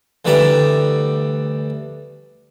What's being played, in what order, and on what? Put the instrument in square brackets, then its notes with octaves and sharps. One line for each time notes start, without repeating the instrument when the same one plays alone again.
[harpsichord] D2 E3 G3 D5 E5 A#5